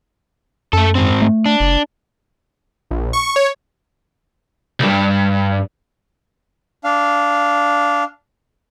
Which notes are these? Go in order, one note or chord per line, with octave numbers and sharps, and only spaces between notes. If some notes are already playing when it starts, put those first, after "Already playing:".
F#2 A3 A4
G#2 C4
A3
D4
F#1
A#1
C#6
C#5
C2 G2
D4 F5